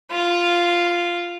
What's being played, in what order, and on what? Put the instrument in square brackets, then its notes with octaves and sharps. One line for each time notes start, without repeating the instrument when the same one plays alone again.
[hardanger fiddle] F4